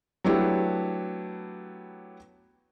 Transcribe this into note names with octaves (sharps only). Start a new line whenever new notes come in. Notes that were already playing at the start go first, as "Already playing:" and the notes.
F#3 A3 B3 D4 E4 G4